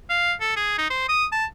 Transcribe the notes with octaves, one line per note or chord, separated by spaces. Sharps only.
F5
A4
G#4
D#4
C5
D#6
A5